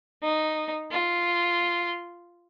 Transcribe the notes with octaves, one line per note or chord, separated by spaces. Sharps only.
D#4
F4